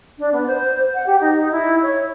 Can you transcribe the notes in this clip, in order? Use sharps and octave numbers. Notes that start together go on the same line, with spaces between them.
D4
B3
C5
F#5
G4
D#4
E4
C#5